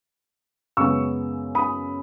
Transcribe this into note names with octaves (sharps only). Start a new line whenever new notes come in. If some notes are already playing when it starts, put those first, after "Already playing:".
F#2 C#3 G#3 B3 C#6 E6
B5 D#6